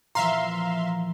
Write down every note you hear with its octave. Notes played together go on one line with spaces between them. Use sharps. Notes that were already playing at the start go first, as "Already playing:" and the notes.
A#2 E3 F3 E5 F5 A#5 C6